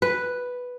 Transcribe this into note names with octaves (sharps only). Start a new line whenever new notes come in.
B4